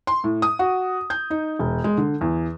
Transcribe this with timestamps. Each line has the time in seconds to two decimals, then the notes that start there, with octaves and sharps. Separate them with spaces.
0.07 C6
0.24 A2
0.42 D#6
0.59 F#4
1.10 G6
1.30 D#4
1.59 E1
1.84 G#3
1.98 D3
2.21 E2